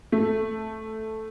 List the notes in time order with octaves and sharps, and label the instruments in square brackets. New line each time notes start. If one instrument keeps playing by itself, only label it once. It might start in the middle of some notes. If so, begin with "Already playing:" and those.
[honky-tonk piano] A3